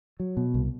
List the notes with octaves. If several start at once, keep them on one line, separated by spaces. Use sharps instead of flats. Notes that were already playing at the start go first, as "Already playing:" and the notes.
F#3
B2
C2